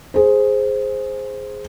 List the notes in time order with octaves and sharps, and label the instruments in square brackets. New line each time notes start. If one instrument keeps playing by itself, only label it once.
[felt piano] G#4 C5